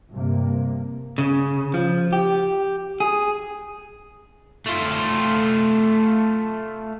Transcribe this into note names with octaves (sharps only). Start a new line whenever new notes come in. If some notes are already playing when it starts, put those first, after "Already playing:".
G2 C3 A#3
C#3
F3
G4
G#4
A3 F4